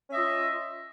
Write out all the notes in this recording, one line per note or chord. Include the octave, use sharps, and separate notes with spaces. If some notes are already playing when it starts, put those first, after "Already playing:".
C#4 F4 D#5 E5